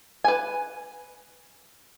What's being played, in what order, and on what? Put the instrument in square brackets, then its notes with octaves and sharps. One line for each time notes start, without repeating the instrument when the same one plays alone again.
[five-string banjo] B4 G#5